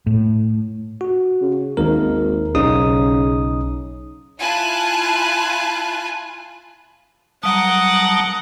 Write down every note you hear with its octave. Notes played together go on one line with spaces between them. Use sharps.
A2
F#4
C#3
G#1 D#2 A#4
B1 C#3 D#4 D#6
E4 F4 G#5 A5 F#6
F#3 G3 F#5 A5 A#5 D#6